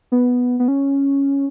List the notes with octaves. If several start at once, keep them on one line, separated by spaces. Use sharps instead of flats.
B3
B3
C#4